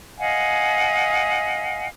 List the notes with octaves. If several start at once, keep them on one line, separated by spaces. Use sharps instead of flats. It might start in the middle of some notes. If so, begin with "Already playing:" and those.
D#5 F5 F#5 G#5